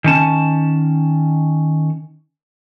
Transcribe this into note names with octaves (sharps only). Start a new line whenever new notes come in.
D#3 C#4 A5